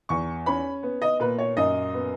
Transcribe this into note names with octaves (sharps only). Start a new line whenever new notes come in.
E2 C#6
C#4 B5
B3
D#5
A#2 B4
C#5
F#2 D#5
B3